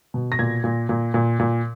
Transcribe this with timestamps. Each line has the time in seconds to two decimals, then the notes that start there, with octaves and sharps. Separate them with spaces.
0.14 B2
0.32 A#6
0.39 A#2 G#6
0.64 A#2
0.89 A#2
1.14 A#2
1.40 A#2